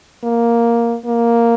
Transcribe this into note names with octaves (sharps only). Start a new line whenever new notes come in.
A#3
A#3